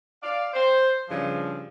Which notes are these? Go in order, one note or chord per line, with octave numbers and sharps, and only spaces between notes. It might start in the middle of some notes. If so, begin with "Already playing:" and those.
D5 F5
C5
G2 C#3 F3